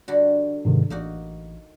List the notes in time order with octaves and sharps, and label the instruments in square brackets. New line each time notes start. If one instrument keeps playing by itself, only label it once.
[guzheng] D3 G3 F#4
[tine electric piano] G#2 C3 D#3
[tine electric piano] A1 [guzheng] A#3 D#4 F#4